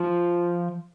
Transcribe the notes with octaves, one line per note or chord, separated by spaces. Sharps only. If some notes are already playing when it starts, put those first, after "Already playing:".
Already playing: F3